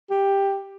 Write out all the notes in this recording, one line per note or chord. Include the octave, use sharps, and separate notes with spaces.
G4